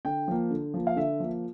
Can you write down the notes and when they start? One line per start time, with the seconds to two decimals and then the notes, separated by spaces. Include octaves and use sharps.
0.05 D3 G5
0.28 F3 A#3
0.51 D3
0.74 F3 A#3
0.87 F5
0.96 D3 E5
1.20 F3 A#3